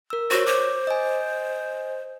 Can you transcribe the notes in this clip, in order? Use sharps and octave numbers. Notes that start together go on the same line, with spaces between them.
A#4 E6
F#4 C5 C#5
C5 D6
D#5 G#5